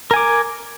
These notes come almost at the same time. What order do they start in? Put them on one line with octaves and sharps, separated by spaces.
A#4 G#5 D6